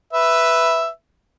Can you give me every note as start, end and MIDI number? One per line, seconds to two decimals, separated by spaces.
0.13 0.88 71
0.13 0.88 76